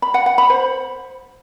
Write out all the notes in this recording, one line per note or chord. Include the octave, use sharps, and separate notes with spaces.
B5
F#5
F#5
B5
C5